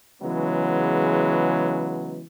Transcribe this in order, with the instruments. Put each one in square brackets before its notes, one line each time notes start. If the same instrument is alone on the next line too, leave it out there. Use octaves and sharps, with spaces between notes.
[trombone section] C#3 E3 F#3 G#3 B3